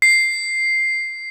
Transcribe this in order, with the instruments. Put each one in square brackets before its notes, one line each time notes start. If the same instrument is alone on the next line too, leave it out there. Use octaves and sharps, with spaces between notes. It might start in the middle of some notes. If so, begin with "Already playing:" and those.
[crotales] C7